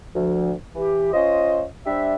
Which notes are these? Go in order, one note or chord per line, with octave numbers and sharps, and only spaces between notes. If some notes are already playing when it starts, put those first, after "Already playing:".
D2 F3
E3 G4
C#4 F4 C5 D#5
G3 D4 G4 C5 E5